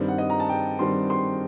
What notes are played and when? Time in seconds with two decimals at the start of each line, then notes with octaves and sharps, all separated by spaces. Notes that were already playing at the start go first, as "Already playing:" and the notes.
Already playing: G2 D#3 G3 C4
0.08 F#5
0.18 D#5
0.30 A#5
0.40 A5
0.49 G5
0.79 G2 D#3 G3 C4 C6
1.10 C6